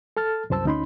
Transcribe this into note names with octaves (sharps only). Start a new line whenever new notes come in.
A4 A5 F6 A6
C2 F#2 C5 A5 E6
D2 C#4 D#4 B5 C6